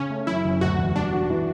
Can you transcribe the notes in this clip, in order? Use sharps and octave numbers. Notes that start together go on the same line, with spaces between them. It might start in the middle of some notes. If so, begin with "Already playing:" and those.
Already playing: C#3 C#4
A3
F#2 E4
F#1
D2 F#4
E1
G3 D4
F#4
E3